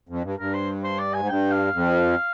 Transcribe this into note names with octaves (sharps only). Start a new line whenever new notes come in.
F2
G2
G2 A#4
C5
C5
D5
G#5
G#2
G2 G5
F5
F2